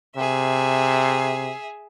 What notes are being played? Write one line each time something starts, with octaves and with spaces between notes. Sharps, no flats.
C3 G#4 E5